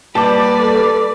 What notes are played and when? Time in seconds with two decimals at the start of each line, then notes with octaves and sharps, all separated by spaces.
0.15 G3 A#3 G4 B4 D5 A5 D6
0.59 A4